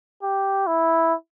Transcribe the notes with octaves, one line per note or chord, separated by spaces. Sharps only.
G4
E4